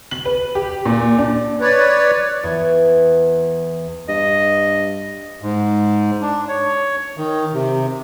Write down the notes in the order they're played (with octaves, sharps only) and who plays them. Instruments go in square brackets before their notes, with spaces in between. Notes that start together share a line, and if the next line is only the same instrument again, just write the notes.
[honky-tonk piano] F#7
B4
G4
A#2
D4
[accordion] B4 C#5 D5
[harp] E2
[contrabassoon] G2 [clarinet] D#5
[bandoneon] G#2
D4
C#5
D#3
C3